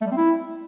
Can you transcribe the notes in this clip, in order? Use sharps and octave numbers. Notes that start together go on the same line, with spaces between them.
A3
G3
C4
E4